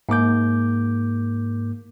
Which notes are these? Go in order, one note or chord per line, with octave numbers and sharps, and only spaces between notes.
G#2 A#3 D6 G6